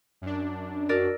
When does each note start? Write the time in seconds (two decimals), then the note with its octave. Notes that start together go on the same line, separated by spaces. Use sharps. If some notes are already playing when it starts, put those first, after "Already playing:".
0.21 F#2 D4
0.89 F#4 A#4 D5 E6